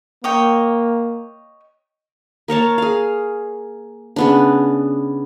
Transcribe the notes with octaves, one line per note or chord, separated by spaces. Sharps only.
A#3 C#5 D#5 G5
A#3 A#4 C#5 A5
G#4 F5
C#3 B3 D4